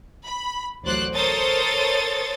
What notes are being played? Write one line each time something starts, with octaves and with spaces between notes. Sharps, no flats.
B5
A1 D2 F#3 C5 D5 F#6
A4 A#4 C5 C#5 D#6 A6